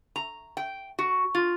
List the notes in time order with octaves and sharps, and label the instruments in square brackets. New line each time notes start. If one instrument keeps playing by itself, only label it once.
[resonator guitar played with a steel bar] A#5
G5
F#4
F4